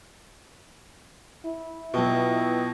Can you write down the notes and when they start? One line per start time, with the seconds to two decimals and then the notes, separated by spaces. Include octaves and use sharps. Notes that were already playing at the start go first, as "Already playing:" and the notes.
1.45 E4
1.94 B2 F#3 F4 G5 A5